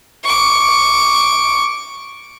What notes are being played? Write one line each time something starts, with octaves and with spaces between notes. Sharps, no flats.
C#6 D6